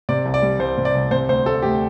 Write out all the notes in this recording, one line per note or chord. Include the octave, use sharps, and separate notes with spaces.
C3 D5
C2
D5
G3
C2 C5
C3
D5
C2
C3 C5
D2 C5
A3 A4
D2 G4